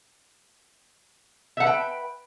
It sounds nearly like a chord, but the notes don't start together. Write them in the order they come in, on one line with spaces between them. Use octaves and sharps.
E5 F#5 B4 G5